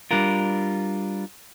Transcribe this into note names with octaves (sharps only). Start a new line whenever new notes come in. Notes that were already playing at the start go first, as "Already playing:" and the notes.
G3 D4 F4 A#4